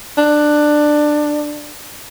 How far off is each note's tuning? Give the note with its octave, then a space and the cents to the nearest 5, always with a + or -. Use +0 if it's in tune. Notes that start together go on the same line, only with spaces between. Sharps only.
D4 +15